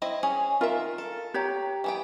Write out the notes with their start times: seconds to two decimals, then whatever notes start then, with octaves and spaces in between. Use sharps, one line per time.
0.02 C4 E4 D#5
0.23 C#4 G#4 G#5
0.61 D#3 F4 A#4 E5
0.98 A4
1.34 G4 C#5 A#5
1.84 E3 B3 G5